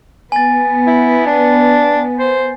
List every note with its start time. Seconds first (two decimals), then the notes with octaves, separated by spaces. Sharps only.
0.32 B3 G#5 A6
0.87 E4
1.26 D4
2.19 C5